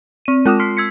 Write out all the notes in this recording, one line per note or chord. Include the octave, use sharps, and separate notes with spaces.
C4 D#7
G#3 F4 D6 D#6
C6 F6 B6 C7
E6 G#6 B6 C#7